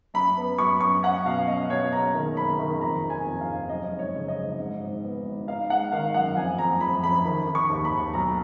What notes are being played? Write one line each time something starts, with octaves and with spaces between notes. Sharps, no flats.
F#2 B5
B3
F#2 C#6
F#2 C#6
C#4 F#5
B2 F5
C#4 D#5
B2 C#5
F#1 A#5
D#3
F#1 B5
D#3
F2 A#5
F1
G#5
F2
F5
F1
F#2 D#5
G#1
C#5
C#3
D#5
G#1
G#2
G#1
B3
G#1
D#4 F5
G#3 F#5
D#3 F5
F#2 F#5
F2 G#5
F2 A#5
F2 B5
F2 B5
D#3 B5
D#3
C#6
D#2
B5
D#2
B1 A#5